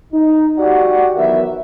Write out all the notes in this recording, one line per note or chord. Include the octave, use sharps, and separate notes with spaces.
D#4
F#4 G4 D5 F#5
D#3 E3 F#3 B3 A#4 E5